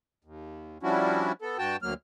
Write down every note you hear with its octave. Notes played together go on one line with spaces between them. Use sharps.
D#2
F3 G3 C#4 D4 E4 F#4
B3 A4
G2 F#4 G5 A5
D2 F#3 A#3 F6